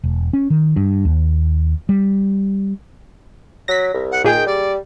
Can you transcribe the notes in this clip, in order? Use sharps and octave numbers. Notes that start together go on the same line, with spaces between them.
E1
C#4
D#3
G2
D#2
G3
F#3 A#6 B6
C2
F#5
A#2 D#3 G#4 G5
G3 D5